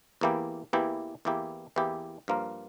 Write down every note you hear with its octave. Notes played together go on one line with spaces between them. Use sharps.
E2 E3 A#3 E4 G4
E2 E3 A#3 E4 G4
E2 E3 A#3 E4 G4
E2 E3 A#3 E4 G4
G2 F3 A#3 F4 A#4